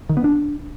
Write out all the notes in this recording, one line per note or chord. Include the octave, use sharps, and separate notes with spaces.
D#3
B3
D4